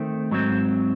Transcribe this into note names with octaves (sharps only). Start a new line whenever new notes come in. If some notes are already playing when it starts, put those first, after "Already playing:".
Already playing: D#3 A3 C4
G#2 F#3 C4